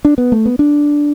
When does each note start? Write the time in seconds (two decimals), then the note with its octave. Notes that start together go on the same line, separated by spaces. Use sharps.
0.05 D4
0.18 B3
0.32 A3
0.46 B3
0.59 D4